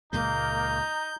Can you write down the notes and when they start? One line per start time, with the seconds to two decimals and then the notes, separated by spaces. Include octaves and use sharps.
0.13 C#2 A#2 G#3 A#3 D#4 G6